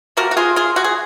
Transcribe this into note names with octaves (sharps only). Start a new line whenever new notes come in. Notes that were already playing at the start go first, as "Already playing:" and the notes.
C3 F3 A#3 F#4 A#4
F#4
F4 G#4
F4 G#4
F#4
G#4